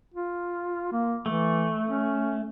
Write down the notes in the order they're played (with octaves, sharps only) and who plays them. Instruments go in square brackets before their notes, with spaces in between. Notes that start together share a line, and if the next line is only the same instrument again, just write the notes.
[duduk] F4
A#3
[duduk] E3 [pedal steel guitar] A3
[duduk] C#4